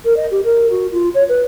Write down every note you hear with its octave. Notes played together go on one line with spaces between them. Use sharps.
A#4
D#5
G4
A#4
F#4
F4
C#5
B4